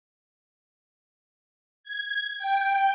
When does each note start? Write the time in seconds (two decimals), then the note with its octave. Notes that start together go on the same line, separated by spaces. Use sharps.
1.83 G#6
2.38 G5